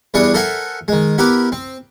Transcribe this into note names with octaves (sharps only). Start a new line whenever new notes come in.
E2 E3 G3 D4 C#6 D#6
A4 A#4 C5 E5 F#5 G#5
D#3 G#3
B3 E4 G4 A#4 B4
C4